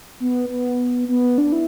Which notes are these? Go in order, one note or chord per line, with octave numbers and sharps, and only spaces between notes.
B3
B3
B3
D4
E4